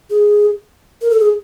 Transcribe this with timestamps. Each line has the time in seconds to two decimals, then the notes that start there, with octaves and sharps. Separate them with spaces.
0.10 G#4
1.01 A#4
1.10 A4
1.20 G#4